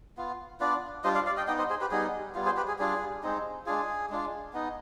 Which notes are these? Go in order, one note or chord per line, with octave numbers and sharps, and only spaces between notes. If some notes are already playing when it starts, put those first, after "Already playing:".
B3 F4
B3 D4 F4 B4 D5
G3 D4 F4 C5 D#5
D5 F5
D5 F5
D#5 G5
B3 D#4 D#5 G5
C5 D#5
G#4 C5
G4 B4
G3 B3 D#4 G#4
G3 B3 F4
G#4 C5
G4 B4
G#4
G3 D4 F4 G#4
G#3 C4 D#4
G#3 D4 F4 G#4
G#3 D4 F4
B3 D#4